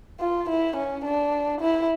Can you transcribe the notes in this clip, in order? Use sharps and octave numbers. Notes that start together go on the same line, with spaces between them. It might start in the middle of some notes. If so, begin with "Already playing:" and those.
F4
E4
C#4
D4
E4